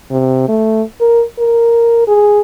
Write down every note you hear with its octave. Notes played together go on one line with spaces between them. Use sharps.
C3
A3
A#4
A#4
G#4